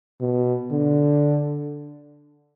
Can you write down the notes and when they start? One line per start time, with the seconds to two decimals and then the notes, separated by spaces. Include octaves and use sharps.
0.21 B2
0.71 D3